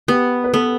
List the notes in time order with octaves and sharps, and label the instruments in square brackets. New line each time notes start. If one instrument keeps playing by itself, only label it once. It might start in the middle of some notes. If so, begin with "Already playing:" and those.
[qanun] B3 [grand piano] G4
[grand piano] B4
[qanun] B3 [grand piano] A4